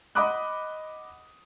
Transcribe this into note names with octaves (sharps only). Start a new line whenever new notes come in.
D#5 F#5 B5 D6 D#6 F#6